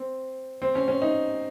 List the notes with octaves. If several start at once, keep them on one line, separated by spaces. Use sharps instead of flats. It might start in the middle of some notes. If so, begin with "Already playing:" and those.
Already playing: C4
C4
C#4
C#4
D#4